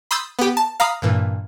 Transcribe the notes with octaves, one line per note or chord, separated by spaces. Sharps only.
B5 C6 D#6 E6 G6 A6
B3 G4
A5
F5 A#5 B5 D#6
G2 A#2 E3